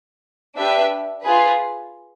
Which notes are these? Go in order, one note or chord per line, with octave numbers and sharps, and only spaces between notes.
D4 G4 B4 E5
F4 G#4 B4